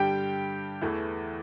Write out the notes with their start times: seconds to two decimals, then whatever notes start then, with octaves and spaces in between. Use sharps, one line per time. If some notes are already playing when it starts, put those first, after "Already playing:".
Already playing: G2 D3 G3 G4 G5
0.82 E2 E3 A3